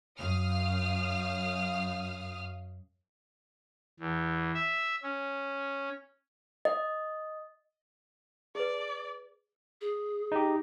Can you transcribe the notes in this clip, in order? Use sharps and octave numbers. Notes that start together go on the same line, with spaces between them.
F#2 F5 D#6 F6
E2
E5
C#4
D#5
G#4 B4 D5
G#4
D#4 G4